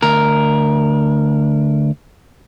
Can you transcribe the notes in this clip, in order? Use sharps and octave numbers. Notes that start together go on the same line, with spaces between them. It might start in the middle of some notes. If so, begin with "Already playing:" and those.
D2 A#4